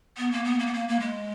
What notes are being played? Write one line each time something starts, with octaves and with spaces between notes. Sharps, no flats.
B3
A#3
B3
A#3
B3
A#3
A#3
G#3